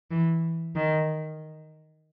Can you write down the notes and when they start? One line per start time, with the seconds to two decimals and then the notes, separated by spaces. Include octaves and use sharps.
0.11 E3
0.75 D#3